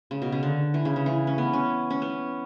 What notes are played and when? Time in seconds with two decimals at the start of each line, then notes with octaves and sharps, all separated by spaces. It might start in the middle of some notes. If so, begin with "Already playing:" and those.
0.11 C#3
0.22 B2
0.32 C#3
0.43 D3
0.74 E3
0.85 C#3
0.96 C#3
1.06 E3
1.27 C#4
1.38 B3
1.53 C#4
1.90 C#4
2.02 B3